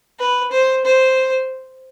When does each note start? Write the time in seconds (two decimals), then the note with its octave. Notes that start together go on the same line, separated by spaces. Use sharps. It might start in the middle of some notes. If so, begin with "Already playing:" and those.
0.19 B4
0.52 C5
0.85 C5